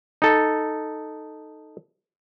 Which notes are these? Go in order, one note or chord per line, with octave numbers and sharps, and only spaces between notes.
D#4 A4